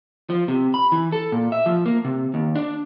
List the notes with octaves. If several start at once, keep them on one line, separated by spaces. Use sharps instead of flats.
F3
C3
B5
E3
A4
A#2
E5
F3
A#3
C3
D#2
D4